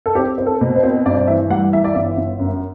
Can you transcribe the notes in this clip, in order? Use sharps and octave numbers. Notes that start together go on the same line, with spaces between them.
A4
C4 G4
C4
A4
B2
C5
C4
G2 D5
D5
E3 E5
G3 F#5
E3 E5
D5
G1 E5
G1
F#2